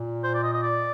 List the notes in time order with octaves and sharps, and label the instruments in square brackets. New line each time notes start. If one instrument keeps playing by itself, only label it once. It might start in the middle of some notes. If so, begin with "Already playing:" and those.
Already playing: [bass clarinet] A#2
[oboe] C5
D5
D#5
D#5
D5